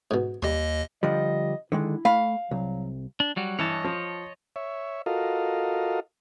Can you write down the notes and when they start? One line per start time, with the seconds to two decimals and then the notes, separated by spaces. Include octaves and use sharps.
0.11 G#2 B2
0.42 D#2 G3 D#5 C6
1.03 D3 F3 G3 D#5
1.72 D3 D#3 G#3 E4
2.05 A3 F5 B5
2.51 C2 F#3
3.20 D4
3.36 F#3 G3 F#4
3.59 G2 E3 C#5 D#5 A5
3.84 F3
4.56 C#5 E5
5.06 F4 F#4 A4 A#4 D#5 F5